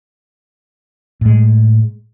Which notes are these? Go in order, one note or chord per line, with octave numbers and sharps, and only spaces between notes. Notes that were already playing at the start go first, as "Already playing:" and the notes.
A2 G#3